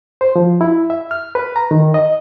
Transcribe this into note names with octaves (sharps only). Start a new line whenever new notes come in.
C5
F3
E4
E5
F6
B4
A#5
D#3
D#5